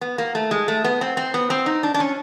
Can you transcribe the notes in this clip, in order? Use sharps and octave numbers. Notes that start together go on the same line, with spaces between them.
B3
A#3
A3
G#3
A3
B3
C4
C4
B3
C4
D#4
D4
D4
C#4